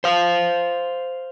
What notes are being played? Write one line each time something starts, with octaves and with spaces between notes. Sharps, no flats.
C5 F5